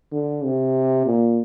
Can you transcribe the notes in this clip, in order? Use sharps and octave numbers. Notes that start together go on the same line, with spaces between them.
D3
C3
A#2